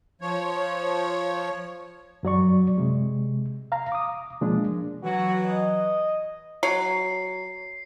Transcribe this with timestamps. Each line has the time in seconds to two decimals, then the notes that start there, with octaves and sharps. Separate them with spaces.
0.22 F3 C#5
2.23 F#2 F#3 D5 C#6
2.78 C3 G#3
3.72 F5 A#5
3.92 D6 D#6
4.41 B2 F3 G#3 A#3 D4
5.03 E3 F#3 F#4
5.45 D#5
6.63 F#3 C7